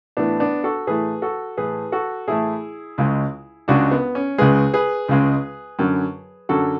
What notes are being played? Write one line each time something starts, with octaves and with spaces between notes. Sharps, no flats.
A2 E3 A3 B3 D4
B3 D4
F#4 A4
A2 E3 A3 G#4 B4
F#4 A4
A2 E3 A3 G#4 B4
F#4 A4
A2 E3 A3 E4 G#4
C#2 C#3 G#3
C#2 C#3 G#3 D4 F#4
B3
C#4
C#2 C#3 G#3 G#4 B4
G#4 B4
C#2 C#3 G#3
F#2 D3 F#3
F#2 D3 F#3 F#4 A4